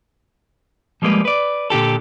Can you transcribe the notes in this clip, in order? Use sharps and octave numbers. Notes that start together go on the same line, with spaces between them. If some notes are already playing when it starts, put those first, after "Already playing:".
F3 G3 G#3 A#3 B4
B4 D5
A#2 D3 G4 A4